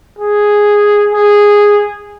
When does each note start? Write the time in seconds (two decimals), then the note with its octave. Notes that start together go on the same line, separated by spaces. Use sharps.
0.19 G#4
1.13 G#4